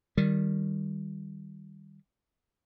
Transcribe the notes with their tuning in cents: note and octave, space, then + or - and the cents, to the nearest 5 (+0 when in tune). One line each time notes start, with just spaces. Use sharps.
D#3 -5 G3 +0